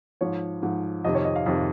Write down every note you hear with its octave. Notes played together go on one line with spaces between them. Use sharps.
G#2 F3 C#5
G#2 F3
F2 C3 D#3 D#5
C#5
D#5
F5
F2 C3 D#3 F5